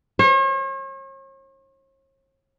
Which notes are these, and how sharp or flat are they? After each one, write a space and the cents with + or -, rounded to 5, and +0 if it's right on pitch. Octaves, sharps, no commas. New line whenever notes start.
C#5 -45